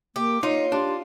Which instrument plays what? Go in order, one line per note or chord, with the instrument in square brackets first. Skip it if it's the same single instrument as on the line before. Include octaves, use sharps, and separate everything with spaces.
[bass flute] A#3 [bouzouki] G4
[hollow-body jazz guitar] D#4 [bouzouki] F4 [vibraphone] C#5 [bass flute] D#5
[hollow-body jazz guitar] D4 [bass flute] G4 [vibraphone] C6